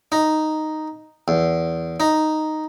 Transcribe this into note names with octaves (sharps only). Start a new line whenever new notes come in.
D#4
E2
D#4